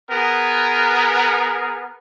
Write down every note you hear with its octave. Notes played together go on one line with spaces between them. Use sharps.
B3 G#4 A#4